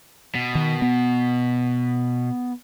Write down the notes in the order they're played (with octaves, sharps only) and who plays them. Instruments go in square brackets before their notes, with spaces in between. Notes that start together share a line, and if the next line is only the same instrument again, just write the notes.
[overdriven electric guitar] B2
[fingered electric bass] D#3
B3